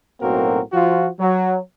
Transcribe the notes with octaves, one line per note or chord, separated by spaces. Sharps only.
B1 A2 A#3 C4 F#4 A#4
F3 F4 F#4
F#3